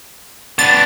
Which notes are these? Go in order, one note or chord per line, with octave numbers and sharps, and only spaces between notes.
B3 D4 A6